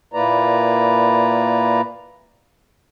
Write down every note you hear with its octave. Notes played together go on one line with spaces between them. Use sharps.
A#2 A#3 E4 B4 D5 A#5